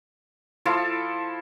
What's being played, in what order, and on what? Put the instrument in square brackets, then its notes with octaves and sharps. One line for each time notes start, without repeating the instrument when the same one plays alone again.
[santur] F3 E4 A4 F5